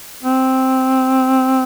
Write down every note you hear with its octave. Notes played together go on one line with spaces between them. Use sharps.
C4